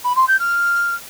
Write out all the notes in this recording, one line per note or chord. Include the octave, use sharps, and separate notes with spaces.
B5
C6
G6
F6